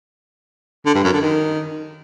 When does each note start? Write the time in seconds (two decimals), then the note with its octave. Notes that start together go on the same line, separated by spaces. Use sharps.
0.86 D3
0.95 G2
1.04 F#2
1.13 D3
1.22 D#3